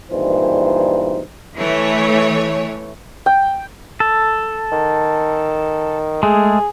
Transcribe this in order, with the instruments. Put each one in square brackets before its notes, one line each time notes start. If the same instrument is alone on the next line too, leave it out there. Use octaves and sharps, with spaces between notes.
[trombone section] G#1 G2 A#2 E3 D#4 C5
[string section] E3 A3 C#5
[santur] G5
[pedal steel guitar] A4
[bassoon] D#3
[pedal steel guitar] G#3 A3 [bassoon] G#4